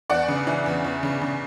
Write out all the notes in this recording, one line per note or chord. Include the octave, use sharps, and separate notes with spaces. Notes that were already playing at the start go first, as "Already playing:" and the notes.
E2 D5 F#5
C#3
E3
E2
E2
C#3
C#3